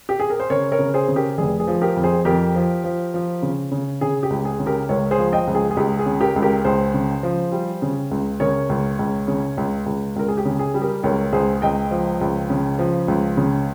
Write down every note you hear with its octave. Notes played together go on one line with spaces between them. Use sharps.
G4
G#4
A#4
C5
C#3 A#4 C#5
A#4 C#5
C#3
G#4 C5
C#3
G4 A#4
F1 G#4
G#4
F3
G4 A#4
F2
G#4 C5
F2 G4 A#4
F3
F3
F3
C#3
C#3
C#3 G#4
G4
C#2
G#4
C#3
G4 A#4
C#2 A#4 C#5
G#4 C5
F3
D#5 G5
C#2
G#4
G#4
C#2 G4
G#4
C#3
G4 A#4
C#2
G4 A#4
C#2 G#4 C5
C#3
F3
G3
C#3
C#2
C#3 A#4 C#5
C#2
C#2
C#3
C#2
C#2
C#2 A#4
G#4
G4
C#3
G#4
G3
G4 A#4
C#2 A#4 C#5
C#2 G#4 C5
C#2 D#5 G5
F3
C#2
C#3
F3
C#2
C#3